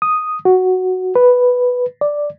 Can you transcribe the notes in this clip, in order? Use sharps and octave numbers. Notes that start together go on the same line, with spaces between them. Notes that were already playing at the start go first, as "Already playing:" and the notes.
D#6
F#4
B4
D5